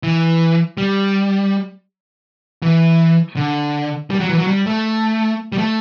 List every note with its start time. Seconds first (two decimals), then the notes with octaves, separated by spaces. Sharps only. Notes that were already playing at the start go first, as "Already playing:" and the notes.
0.03 E3
0.77 G3
2.63 E3
3.36 D3
4.10 G3
4.20 F#3
4.29 E3
4.38 F#3
4.47 G3
4.66 A3
5.52 G3
5.58 A3